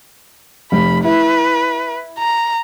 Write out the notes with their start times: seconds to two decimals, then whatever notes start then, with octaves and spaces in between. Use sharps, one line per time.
0.72 F1 B5
1.04 E4 B4
2.19 A#5